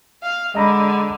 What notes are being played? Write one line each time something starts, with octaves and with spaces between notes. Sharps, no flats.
F5
D3 G#3 D#5 A#5 B5